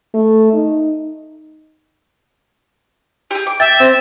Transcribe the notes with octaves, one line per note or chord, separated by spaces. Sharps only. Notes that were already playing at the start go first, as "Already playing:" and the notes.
A3
D#4
G4 G#4
D6
E5 G5 A6
C4